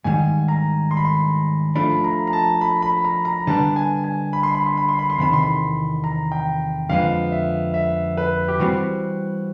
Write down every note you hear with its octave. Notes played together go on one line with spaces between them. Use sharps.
G#2 D#3 G3 G#5
A#5
C6
B5
C6
F3 A3 D4 B5
A#5
A#5
A5
B5
B5
A#5
A#5
D3 G3 B3 D4 A5
G#5
G#5
B5
C6
B5
C6
B5
C6
B5
C6
E2 C3 D#3 B5
C6
B5
A#5
G5
F2 D3 F3 G#3 B3 F5
E5
E5
B4
G4
E3 G3 C4 F#4